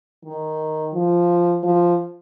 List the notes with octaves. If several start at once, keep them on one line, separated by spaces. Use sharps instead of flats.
D#3
F3
F3